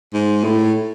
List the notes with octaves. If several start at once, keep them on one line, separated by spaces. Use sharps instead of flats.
G#2
A2